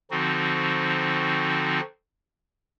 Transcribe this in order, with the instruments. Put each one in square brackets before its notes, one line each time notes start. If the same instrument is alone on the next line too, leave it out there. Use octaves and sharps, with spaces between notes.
[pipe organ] D3 F3 C4 D#4 F#4